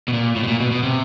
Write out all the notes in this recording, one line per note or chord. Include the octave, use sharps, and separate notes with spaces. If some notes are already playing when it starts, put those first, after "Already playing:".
B2
A#2
A2
B2
A#2
B2
B2
C3